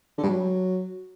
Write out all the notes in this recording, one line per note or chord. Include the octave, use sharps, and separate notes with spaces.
D3
G2
F#3